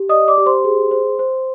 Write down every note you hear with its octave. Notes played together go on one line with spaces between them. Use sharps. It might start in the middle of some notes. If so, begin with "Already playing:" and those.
Already playing: G4
D5 D#5 D#6
D5 D6
G4
C5 C6
G#4
C5
C5